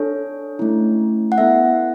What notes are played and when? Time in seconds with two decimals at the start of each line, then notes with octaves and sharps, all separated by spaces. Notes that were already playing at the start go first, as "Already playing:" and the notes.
Already playing: D4 A4 C#5
0.59 A3 C#4 E4
1.32 F#5
1.38 B3 E4 A4 E5